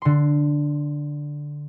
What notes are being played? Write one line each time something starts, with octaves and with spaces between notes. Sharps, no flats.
D3 C6